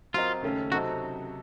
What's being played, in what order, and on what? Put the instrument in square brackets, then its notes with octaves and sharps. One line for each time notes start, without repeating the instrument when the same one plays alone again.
[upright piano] F#3 C4 F#4 A#4 D#5 [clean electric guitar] F4
[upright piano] D#2 C#3 A3 C#4 A4
[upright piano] C3 F#3 C4 D#4 A4 [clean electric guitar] F#4